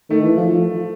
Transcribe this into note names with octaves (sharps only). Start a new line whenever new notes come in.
D#3 A3
E3
F3